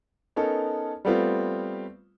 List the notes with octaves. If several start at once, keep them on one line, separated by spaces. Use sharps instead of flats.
B3 C#4 D#4 A4 A#4
G3 A3 B3 C4 F4